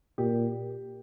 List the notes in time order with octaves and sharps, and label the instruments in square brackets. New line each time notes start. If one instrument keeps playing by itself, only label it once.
[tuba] A#2 [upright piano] G4